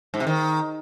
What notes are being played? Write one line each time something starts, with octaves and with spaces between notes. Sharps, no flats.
G#2
C3
D#3